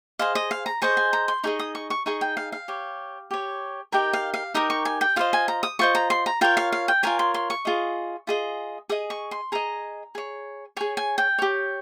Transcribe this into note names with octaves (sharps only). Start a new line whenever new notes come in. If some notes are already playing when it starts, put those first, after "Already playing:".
G#4 C5 D#5 F5
D#5
F5
A#5
G#4 C5 D#5 C#6
G#5
A#5
C6
D#4 G#4 D#5 C#6
D#6
C#6
C#6
D#4 G#4 D#5 C#6
G5
F5
F5
G4 C#5
G4 C#5
D#4 G4 A#4 G5
F5
F5
D#4 G4 A#4 D#6
C#6
G#5
G5
F4 C5 D#5 F5
G#5
A#5
D#6
F4 C5 D#5 C#6
A#5
C6
A#5
F4 A#4 C#5 G5
F5
F5
G5
F4 A#4 C#5 G#5
C6
C6
C#6
F4 G#4 D#5
F4 G#4 D#5
G#4 D#5 D#6
C#6
C6
G#4 D#5 A#5
G#4 C#5
G#4 C#5 G#5
G#5
G5
G4 C#5